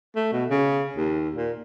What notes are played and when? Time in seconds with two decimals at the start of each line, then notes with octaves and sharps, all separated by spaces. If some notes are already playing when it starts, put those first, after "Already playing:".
0.16 A3
0.33 B2
0.51 C#3
0.96 D#2
1.36 A#2